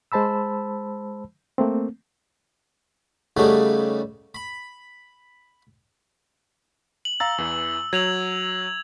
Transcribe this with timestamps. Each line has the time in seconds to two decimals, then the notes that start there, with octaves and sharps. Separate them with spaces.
0.12 G#3 C5 A5 B5 E6
1.58 A3 A#3 C4
3.37 C#3 G3 A3 B3 D#4
4.35 B5
7.05 F#7
7.20 F5 A#5 E6 A6
7.38 E2 E3
7.93 F#3 G#6 F7 F#7